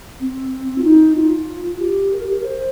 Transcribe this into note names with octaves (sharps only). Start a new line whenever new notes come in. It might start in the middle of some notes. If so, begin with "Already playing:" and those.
C4
F4
D#4
F4
G4
A#4
G4
A#4
C5